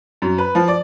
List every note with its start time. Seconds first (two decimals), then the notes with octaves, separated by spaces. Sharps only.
0.22 F#2
0.38 B4
0.55 F3
0.68 D5